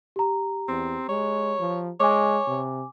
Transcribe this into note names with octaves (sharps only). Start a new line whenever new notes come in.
G4 A#5
E2 C4
G#3 C#5
F3
G#3 C#5 G#5 D6
C3